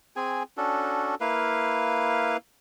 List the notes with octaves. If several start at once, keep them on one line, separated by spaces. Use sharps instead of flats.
C4 G#4 G#5
C#4 D4 F#4 A4
A#3 E4 B4 F5